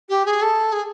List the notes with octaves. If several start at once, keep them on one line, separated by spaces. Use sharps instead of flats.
G4
G#4
A4
G#4